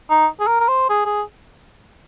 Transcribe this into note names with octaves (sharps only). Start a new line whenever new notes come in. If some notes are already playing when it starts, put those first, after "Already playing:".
D#4
G#4
A#4
A#4
C5
G#4
G#4